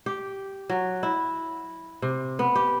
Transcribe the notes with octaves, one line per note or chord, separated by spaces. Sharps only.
G4
F#3
E4
C3
B3
G4